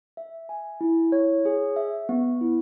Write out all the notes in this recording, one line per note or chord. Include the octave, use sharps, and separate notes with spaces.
E5
G#5
E4
C#5
G#4
E5
B3
E4